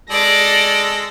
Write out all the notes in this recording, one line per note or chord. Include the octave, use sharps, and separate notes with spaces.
G#3 A4 D5 A#6